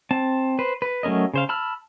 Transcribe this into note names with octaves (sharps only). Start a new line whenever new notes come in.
C4 A5
B4 C5
B4
F#3 A3 C#4 A#4 D#5
C#3 C5 F5
A5 B5 E6 F6